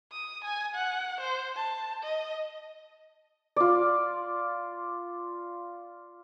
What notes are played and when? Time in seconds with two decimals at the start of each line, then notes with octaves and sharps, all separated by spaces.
0.12 D#6
0.44 G#5
0.75 F#5
1.20 C5
1.56 A5
2.03 D#5
3.56 F4 D5